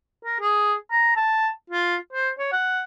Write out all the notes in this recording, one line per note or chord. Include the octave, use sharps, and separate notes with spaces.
A#4
G#4
A#5
A5
F4
C5
C#5
F#5